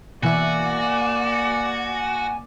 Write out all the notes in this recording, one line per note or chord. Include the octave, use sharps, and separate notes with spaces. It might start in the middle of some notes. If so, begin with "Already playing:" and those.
B2 E3 A#3 F#4 D5 E5 G#5